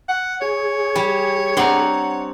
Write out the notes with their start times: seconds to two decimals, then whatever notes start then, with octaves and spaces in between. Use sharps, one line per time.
0.09 F#5
0.42 G#4 C#5
0.95 G3
1.57 C4 D4 F#5 A#5 C6